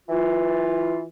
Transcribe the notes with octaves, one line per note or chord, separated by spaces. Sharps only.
E3 F4